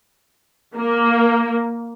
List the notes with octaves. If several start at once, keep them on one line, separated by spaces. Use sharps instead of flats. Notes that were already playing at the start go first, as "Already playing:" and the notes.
A#3